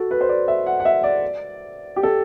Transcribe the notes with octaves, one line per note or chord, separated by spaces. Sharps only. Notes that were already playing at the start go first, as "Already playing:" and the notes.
Already playing: F#4 A4
B4
C5
D5
E5
F#5
F#5
E5
D5
G4
A4